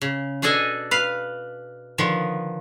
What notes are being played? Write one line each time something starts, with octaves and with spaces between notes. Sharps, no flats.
C#3
B2 D4 G#4 A4 D#5 G#5
B4 F5
D3 D#3 F3 B3